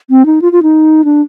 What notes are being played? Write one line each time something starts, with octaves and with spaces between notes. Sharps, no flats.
C4
D#4
F4
F4
D#4
D4